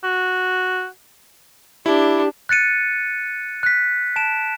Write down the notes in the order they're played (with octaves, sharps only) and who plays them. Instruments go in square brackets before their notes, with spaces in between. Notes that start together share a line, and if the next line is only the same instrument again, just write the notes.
[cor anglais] F#4
[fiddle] D4 [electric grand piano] E4 [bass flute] G4
[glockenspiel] F#6 A6 C#7 D#7
F#6 B6
A5 D7 E7